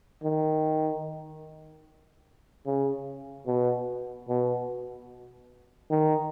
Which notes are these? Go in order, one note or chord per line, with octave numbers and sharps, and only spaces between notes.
D#3
C#3
B2
B2
D#3